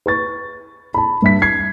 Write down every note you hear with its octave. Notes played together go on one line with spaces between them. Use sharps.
B4 C#6 A6
A5 B5
G2 E5 B6
G#6 C7